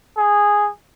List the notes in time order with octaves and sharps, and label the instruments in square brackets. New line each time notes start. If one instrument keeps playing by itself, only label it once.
[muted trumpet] G#4